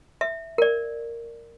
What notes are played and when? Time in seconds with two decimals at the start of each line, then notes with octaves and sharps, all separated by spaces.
0.21 E5
0.58 A#4 D5